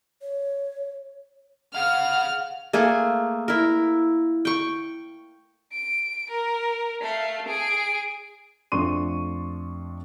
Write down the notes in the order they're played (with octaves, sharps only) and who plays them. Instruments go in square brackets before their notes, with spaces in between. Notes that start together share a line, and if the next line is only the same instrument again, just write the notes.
[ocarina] C#5
[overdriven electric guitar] G#4 F5 [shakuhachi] F#5 [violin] F6
[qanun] A3 A#3 G#4
E4 A#4
G5 C#6
[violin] D7
A#4
A3 F5
G#4 D7
[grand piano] F2 A3 D4 C6 C#6 D#7